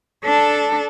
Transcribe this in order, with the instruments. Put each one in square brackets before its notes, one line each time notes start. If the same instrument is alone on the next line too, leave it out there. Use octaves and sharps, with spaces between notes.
[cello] D4 A4